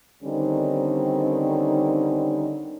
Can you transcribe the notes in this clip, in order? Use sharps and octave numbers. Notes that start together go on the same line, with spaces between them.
D3 D#3 G3 C4 C#4 D#4